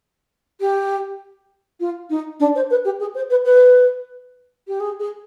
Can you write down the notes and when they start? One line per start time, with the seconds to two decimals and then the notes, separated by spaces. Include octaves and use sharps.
0.60 G4
1.80 F4
2.10 D#4
2.39 D4
2.55 C5
2.70 B4
2.85 G4
3.00 G#4
3.14 C5
3.30 B4
3.44 B4
4.67 G4
4.80 G#4
4.99 G#4